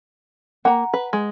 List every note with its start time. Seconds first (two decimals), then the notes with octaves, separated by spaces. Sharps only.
0.65 A#3 F#5 A#5
0.94 B4
1.13 G#3